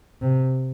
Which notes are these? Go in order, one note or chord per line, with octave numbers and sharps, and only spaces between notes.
C3